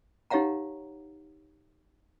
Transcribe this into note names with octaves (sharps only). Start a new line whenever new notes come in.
D#4 G4 C#5 F5 F#5 A#5